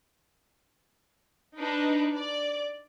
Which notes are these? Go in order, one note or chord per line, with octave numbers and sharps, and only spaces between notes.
D4 D#4 B4
D5